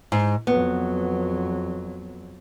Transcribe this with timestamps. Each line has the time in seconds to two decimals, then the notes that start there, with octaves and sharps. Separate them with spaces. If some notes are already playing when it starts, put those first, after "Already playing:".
0.12 G#2
0.47 F2 F#3 B3